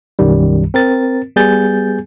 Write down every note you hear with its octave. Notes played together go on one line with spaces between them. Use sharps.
B1 F#2 D#3 G3
C4 A#4 A6
G3 B3 G#4 G#5 G6 A6